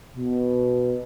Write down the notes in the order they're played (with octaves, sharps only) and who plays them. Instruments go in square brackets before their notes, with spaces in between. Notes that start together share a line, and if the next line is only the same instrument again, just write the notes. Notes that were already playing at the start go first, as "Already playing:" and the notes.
[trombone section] B2